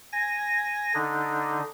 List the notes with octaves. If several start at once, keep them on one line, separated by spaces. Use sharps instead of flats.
G#5 A#6
D3 D4 D#4